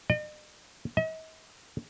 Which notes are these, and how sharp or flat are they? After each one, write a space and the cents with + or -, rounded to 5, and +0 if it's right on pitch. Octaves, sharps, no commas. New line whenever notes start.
D#5 -45
D#5 +45